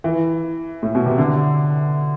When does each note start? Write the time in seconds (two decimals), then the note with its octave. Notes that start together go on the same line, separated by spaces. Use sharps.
0.04 E3
0.83 A2
0.95 B2
1.06 C3
1.18 D3